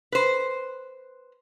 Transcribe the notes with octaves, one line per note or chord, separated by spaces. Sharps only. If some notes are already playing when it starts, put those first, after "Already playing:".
B4 C5